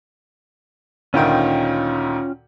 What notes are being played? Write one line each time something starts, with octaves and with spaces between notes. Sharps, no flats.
D2 A#2 D#3 C#4 F4 G5